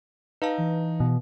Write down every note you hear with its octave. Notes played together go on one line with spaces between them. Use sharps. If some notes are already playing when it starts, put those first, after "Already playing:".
D#4 B4 F5 A5
E3
B2